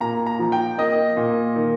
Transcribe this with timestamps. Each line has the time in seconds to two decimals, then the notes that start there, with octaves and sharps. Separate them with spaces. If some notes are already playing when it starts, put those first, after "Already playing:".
0.01 A#2 A#5
0.26 A#5
0.39 F3
0.52 G5
0.78 A#3 D#5
1.17 A#2
1.56 D#3